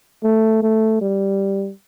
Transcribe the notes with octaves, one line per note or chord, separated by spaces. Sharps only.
A3
A3
G3